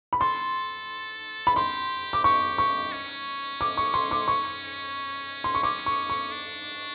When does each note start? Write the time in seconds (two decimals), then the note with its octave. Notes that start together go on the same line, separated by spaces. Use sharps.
0.13 B5
0.21 A4 C6
1.47 B5
1.56 G4 C6
2.13 D6
2.24 G4 C#6
2.58 C#6
2.92 C#4
3.61 D6
3.77 C#6
3.94 C6
4.11 D6
4.28 C#6
5.44 C6
5.55 C#6
5.63 C#4 D6
5.86 C#6
6.10 C#6
6.32 D4